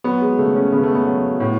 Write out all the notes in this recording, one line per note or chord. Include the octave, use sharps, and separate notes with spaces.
F#3 B3
G#3
C#3 A3
C#4
C#3 B3
A3
B3
F#3
A2